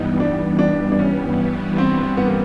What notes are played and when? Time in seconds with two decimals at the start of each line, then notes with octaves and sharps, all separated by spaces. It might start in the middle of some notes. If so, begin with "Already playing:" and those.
Already playing: G2 E3 G3 B3 D#4
0.20 D4
0.59 D4
0.92 D4
0.99 C#4
1.78 C4
2.17 B3
2.27 A#3